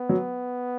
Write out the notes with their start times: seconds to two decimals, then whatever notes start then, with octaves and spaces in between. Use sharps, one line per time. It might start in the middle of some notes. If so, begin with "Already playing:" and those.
Already playing: B3
0.09 F#3